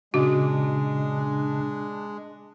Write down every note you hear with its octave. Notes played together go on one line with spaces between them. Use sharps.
A#2 C#3 G#3 D4 F#4 D#5